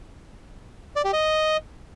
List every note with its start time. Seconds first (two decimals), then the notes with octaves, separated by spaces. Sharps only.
0.96 D5
1.05 G4
1.13 D#5